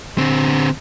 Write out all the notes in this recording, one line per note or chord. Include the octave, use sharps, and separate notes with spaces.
D3 C4